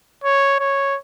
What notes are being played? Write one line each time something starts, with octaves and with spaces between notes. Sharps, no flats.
C#5
C#5